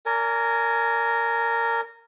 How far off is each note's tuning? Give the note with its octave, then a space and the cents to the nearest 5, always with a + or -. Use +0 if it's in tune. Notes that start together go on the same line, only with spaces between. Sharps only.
A#4 -10 D5 -35 G#5 +20